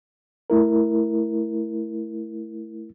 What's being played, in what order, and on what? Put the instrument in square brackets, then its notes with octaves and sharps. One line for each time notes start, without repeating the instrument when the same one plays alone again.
[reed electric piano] A3 E4 A#4